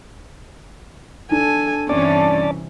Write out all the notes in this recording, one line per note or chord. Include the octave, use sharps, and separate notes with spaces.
D4 A4 G#5
G2 C3 E3 C#4 D5 A5